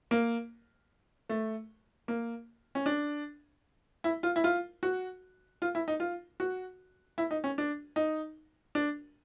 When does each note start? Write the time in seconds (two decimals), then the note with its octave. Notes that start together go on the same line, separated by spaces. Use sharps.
0.11 A#3
1.29 A3
2.08 A#3
2.75 C#4
2.86 D4
4.04 E4
4.23 F4
4.36 E4
4.44 F4
4.83 F#4
5.62 F4
5.75 E4
5.88 D#4
6.00 F4
6.40 F#4
7.18 E4
7.31 D#4
7.44 C#4
7.58 D4
7.96 D#4
8.75 D4